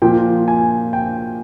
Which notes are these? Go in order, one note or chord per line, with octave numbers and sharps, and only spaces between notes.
A#2 F3 G5
G#5
G5